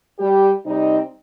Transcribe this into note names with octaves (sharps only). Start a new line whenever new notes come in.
G3 G4
C3 G3 C4 D#4